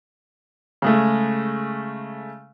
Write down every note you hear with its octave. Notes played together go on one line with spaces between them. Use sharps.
C#3 G#3 A3